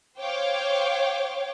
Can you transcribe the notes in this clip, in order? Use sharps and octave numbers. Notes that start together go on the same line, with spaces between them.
C5 C#5 F5 G5 D6